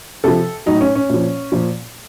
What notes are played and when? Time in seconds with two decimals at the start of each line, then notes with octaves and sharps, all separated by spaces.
0.24 C3 F3 A4
0.66 A2 F#3 D#4
0.81 C#4
0.95 C#4
1.10 A#2 F3
1.52 A#2 F3